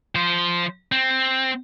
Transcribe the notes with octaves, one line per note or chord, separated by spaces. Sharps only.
F3 C5
C4